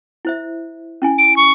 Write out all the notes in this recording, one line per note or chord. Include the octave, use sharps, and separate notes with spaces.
E4 C5 E5
C#4 E4 G#5
D7
C#6